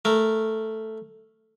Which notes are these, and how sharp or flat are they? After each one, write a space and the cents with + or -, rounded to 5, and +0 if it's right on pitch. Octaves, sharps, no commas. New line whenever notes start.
A3 +0 A#4 -5